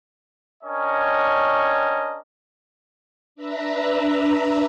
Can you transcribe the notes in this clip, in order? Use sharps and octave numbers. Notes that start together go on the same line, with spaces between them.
C#4 D4 A#4 C#5 D#5 G5
D4 B4 E5 A#5